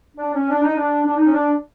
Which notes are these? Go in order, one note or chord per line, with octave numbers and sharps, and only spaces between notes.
D4
C#4
D4
D#4
D4
D4
D#4
C#4
D4